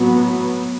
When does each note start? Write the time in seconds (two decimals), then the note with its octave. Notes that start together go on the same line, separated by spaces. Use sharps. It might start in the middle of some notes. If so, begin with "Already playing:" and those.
Already playing: A2 F#3 B3